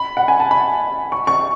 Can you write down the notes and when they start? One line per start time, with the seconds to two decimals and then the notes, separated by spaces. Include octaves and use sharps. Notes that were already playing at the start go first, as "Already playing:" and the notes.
Already playing: B5
0.17 F#5
0.28 G#5
0.40 A5
0.51 B5
1.12 C#6
1.27 C#6